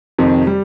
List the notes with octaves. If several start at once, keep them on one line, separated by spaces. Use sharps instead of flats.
F2 C3 D#3
G3